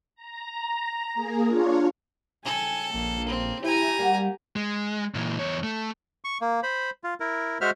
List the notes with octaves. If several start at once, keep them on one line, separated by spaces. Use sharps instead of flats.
A#5
A#3 G#4
D4 F4 C#5
C#3 G3 A4 G#5
A#1 A#3
C4
E4 G4 G#5 A#5
G3 A#3 F#4
G#3
A#2 E3
E2 C#5
A3
C#6
A#3
C5 B5
F4
E4 A#4
G#3 F#4 C5 E5 F6